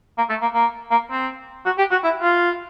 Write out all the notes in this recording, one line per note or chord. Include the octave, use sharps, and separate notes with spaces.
A#3
A3
A#3
A#3
A#3
C4
F#4
G4
F#4
E4
F4